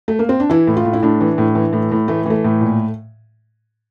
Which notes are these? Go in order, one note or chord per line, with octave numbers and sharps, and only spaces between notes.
A3
A#3
C4
D4
E3 E4
A2
F4
A2
E4
A2 D4
E3
A2
E3
A2
A2
E3 A3
E3 A3
A2
A#2